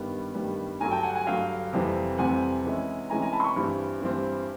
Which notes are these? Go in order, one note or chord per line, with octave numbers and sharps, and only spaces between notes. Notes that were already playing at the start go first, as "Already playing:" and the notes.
Already playing: G2 D#3 G3 B3
G2 D#3 G3 B3
G2 D3 F#3 G#5 A#5
G5 A5
F#5 G#5
F#5 G#5
G2 D3 F#3 F5 G5
F2 C3 E3 G3 C4
F2 C3 E3 G3 C4 F#5 G#5
C3 E3 G#3 C#4 E4
C3 E3 G#3 C#4 E4 G#5 A#5
G#5 A#5
A5 B5
C6
B5 C#6
G2 E3 G3 C4
G2 E3 G3 C4